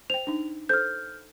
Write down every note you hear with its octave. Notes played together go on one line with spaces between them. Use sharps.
C5 G5 F7
D4 D#4
A4 C5 F6 G6